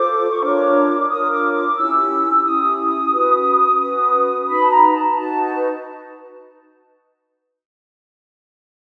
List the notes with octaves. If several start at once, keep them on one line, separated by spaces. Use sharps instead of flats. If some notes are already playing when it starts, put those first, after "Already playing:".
Already playing: F4 A4 C5 D6
C#6
D4 F4 A#4 C#5 D6
D6
D4 F4 A#4 C#5 D#6
D6
D6
D#6
C#4 E4 G4 E6
C#4 E4 G4 D#6
C#4 F#4 B4
C#4 F#4 B4
D#4 F#4 B4 B5
A5
A#5
A#5
A5
D#4 F#4 B4 A5